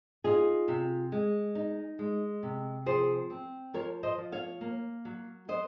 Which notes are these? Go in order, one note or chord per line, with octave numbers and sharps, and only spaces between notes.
D#4 F4 G#4
C3
G#3
D#4
G#3
C3
F3 G#4 C5
C4
F3 A#4 C#5
C5 D#5
F3
C#5 F5
A#3
F#3
F#3 C5 D#5